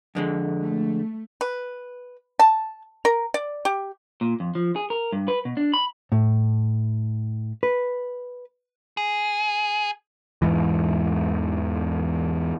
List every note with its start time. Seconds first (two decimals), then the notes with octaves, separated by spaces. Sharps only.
0.15 F2 D3 G#3
0.62 A3
1.41 B4
2.39 A5
3.05 A#4
3.34 D5
3.65 G4
4.21 A#2
4.40 F2
4.55 F3
4.76 G#4
4.90 A#4
5.12 G2
5.28 B4
5.45 B2
5.57 D4
5.74 B5
6.12 A2
7.63 B4
8.97 G#4
10.42 E2 G#2 E3